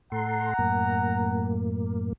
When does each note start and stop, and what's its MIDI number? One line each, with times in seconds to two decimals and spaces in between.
0.12 0.53 45
0.12 0.53 69
0.12 1.58 78
0.12 1.58 82
0.12 0.53 84
0.58 2.13 42
0.58 2.13 45
0.58 2.13 58